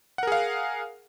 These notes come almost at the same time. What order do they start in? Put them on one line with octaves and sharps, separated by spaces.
F#5 A#4 G#4 F5